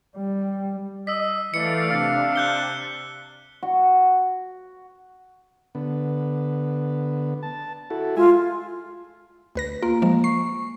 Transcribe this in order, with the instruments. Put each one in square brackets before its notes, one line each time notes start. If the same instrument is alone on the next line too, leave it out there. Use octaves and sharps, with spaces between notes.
[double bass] G3
[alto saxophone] D#5 [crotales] E6 B6
[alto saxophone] E3 [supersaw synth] A3 D5 F5 [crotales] C#7
[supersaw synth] C3 D4 [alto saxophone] F5
[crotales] F#6 G6 G7
[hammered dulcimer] F#4
[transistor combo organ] D3 B3
A5
E4 F#4 A4
[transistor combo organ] G#3 E5 G#5 [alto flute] F4
[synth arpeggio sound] D2 B4 A#6
[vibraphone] A#3 [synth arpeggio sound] F4
[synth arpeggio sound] F3 G#3
[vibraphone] C#6 [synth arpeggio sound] C7